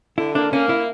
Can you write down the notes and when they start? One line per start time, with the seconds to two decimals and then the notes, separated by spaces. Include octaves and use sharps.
0.18 D3 E4
0.35 A#3 D4
0.52 A#3 C#4
0.69 E4